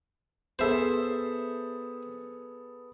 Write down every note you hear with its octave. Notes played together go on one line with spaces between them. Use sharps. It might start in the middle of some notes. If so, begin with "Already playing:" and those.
B3 G#4 A4 C5 E5